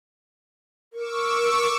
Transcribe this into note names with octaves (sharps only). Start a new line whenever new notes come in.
A#4 C#6 D6 E6